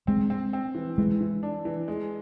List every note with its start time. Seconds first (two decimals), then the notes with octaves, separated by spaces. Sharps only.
0.07 G#3 C4
0.30 C4
0.53 C4
0.75 E3
0.98 E3 G#3
1.21 E3
1.43 D4
1.65 E3
1.88 G#3